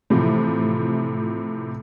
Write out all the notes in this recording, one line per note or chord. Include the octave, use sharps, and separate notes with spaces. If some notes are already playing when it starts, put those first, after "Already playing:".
A2 C3 E3 F3